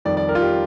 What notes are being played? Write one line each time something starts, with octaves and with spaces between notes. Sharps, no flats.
F2 D#3 G3 D5
D5
A#4
F4
G4